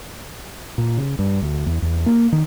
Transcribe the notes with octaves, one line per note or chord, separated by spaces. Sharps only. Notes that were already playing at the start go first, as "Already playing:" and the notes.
A#2
C#3
G2
D2
E2
E2
A#3
D#3